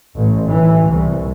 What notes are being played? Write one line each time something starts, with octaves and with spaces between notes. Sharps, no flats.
A1
E3
C2